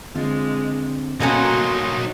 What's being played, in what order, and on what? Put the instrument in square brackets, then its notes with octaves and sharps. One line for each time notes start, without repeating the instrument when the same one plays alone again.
[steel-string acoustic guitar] D3 C4 F4 [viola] G#3
[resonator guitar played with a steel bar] B2 A#3 C#4 [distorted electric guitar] F#3 D#4 [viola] F#4 C6 [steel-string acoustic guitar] A4